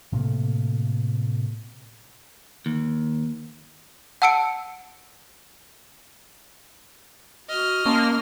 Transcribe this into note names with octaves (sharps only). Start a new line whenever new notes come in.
A2 C3 A3 A#3
D#2
F#5 A5 E6 C#7 D7
F#4 D#5 F6
A#3 C#4 A5 C6 C#6